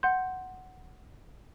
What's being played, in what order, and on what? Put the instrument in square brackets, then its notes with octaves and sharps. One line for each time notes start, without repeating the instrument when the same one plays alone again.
[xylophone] F#5 C6 G6